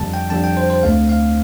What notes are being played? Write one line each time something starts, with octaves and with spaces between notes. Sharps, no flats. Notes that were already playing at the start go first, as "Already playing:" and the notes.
Already playing: F2 D3 G3 A5
G5
F2 D3 G3 A5
G5
C5
C5
D2 D3 A3 C4 F5
F5